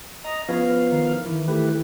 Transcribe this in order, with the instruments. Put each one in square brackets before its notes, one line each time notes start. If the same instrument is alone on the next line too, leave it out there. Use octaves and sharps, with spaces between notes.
[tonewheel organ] D#5 A#5
[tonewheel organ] F3 B3 F5 [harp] C#4 G#4 B4
[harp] D#3
E3
[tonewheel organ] A3 G4 B4